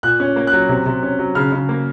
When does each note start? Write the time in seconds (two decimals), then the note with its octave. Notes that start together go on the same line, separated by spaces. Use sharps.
0.03 A#2 F#6
0.20 C#4
0.36 A#3
0.47 F#6
0.53 F#3
0.69 C3
0.86 C3
1.03 C#4
1.19 F#3
1.35 C#3 F6
1.52 C#3
1.69 A#3